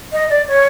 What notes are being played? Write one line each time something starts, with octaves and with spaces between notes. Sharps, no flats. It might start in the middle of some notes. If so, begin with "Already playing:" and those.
D#5
D5
C#5